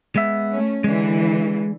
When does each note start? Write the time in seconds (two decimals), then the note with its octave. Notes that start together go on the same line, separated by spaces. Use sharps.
0.16 G#3 B3 E5
0.52 A3 C#4
0.84 D3 E3 G#3